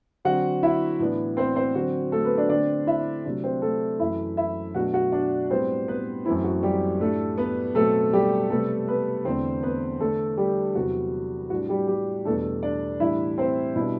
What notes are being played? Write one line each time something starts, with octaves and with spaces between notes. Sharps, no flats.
D3 F#3 C4 F#4 F#5
E4 E5
A2 E3 B3 D4
C4 C5
C4 C5
D3 F#3 C4 F#4
A3 A4
B3 B4
D4 D5
D3 A3 C4 D4 D5
E4 E5
C3 F#3 A3 D4
C4 C5
A3 A4
F#2 E3 A3 E4 E5
E4 E5
B2 F#3 A3 D4 F#4 F#5
F#4 F#5
D4 D5
A2 G3 B3 C4 C5
B3 B4
F#2 E3 A3 C4 E4
F#4
G3 G4
A2 G3 A3 D4 A4
B3 B4
B2 F#3 A3 C4 A4
G3 G4
C3 G3 A3 B3 A4
B3 B4
E2 D3 A3 C4 C5
B3 B4
D3 A3 D4 A4
G3 G4
E2 C3 F#3 F#4
A2 G3 D4 F#4
G3 G4
G3 G4
E2 B2 G3 A3 D4 A4
D4 D5
A2 E3 G3 D4 E4 E5
C4 C5
B2 G3 D4 E4